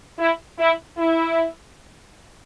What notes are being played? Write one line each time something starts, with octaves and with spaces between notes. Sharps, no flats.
E4
E4
E4